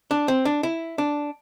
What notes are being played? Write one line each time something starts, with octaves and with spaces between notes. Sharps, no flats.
D4
C4
D4
E4
D4